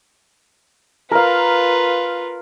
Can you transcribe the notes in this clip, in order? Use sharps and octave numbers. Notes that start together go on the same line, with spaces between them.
F4 A#4 B4 F5